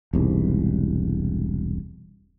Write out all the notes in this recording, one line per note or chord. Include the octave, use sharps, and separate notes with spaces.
E1 C2 G#2